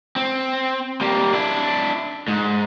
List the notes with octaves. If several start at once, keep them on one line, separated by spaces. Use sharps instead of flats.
C4
G3 A#3
D4 E4
G#2